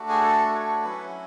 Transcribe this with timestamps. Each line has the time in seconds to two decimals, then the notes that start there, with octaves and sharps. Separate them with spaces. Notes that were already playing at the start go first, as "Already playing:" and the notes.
Already playing: A3 D4 F#4
0.09 G#4
0.23 A4
0.55 C#5
0.84 F#3 C#4 E4 B4